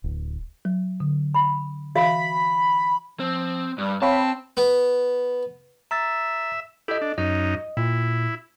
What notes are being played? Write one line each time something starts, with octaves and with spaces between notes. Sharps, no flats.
D1
F#3
D3
B5
E3 F#4 E5 F5 B5
F3 C4
G2 G3
C4 C#5 F5 A5 B5
B3
E5 A#5 E6 A6
E4 G4 A4 D#5
D4
F#2 D#4 D#5
A#2 E4